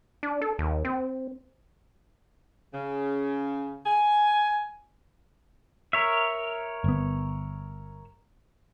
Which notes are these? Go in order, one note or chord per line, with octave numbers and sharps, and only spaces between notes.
D4
A4
D#2
C4
C#3
G#5
A#4 C#5 E5
G1 B3